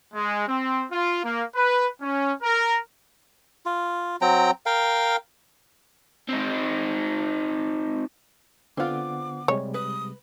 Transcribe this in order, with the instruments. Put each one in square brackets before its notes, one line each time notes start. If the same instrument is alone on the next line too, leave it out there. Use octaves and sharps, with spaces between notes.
[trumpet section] G#3
C4
F4
A#3
B4
C#4
A#4
[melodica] F4
F#3 C4 G5 A#5
A#4 F5 G5
[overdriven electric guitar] C4 D#4
[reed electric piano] D3 B3 F#5 [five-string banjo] C4 F4 [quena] D6
[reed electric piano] C3 G3 G#3 [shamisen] C#5
[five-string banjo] B4 [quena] D#6